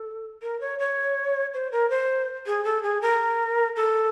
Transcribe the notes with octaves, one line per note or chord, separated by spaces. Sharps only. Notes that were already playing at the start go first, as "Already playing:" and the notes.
Already playing: A4
A#4
C#5
C#5
C5
A#4
C5
G#4
A4
G#4
A#4
A4